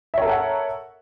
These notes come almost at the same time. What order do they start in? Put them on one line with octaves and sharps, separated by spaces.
E5 C#5 A#4 A4 F#5